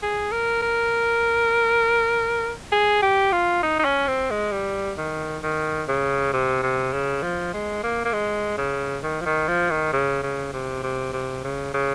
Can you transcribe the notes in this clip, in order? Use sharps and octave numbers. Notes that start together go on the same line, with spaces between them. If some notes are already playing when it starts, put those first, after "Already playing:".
G#4
A#4
A#4
G#4
G4
F4
D#4
D#4
C#4
C4
G#3
G3
D#3
D#3
C#3
C3
C3
C#3
F3
G#3
A#3
A#3
G#3
C#3
D#3
F3
D#3
F3
D#3
C#3
C#3
C3
C3
C3
C#3
C#3